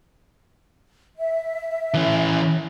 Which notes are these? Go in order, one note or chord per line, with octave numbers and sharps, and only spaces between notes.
E5
E3 C#4